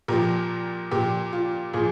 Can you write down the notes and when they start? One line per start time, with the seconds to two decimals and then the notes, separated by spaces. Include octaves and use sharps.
0.08 A#2 F3 G4 A#4
0.91 A#2 F3 G4
1.33 F4
1.73 A#2 F3 F4 G#4